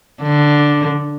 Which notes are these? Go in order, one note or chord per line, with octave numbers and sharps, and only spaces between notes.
D3